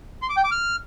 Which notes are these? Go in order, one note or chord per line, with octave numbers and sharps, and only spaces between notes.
C6
D6
G5
D6
F6